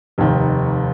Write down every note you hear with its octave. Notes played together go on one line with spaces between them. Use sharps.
F1 D#2 D#3